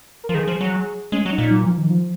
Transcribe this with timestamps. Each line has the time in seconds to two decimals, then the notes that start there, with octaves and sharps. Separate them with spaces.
0.24 A#4
0.29 F3
0.34 D#3 G#4
0.48 F3
0.61 F#3
1.12 G#3 C#4
1.26 F#3
1.32 D#4
1.38 A#2
1.51 F#3
1.64 F3
1.78 D#3
1.90 F3